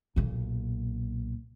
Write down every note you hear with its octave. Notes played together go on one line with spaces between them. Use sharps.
B1 A#2